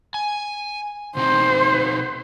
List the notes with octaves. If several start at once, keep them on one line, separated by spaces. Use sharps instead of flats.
G#5
B2 C4 D#4 C5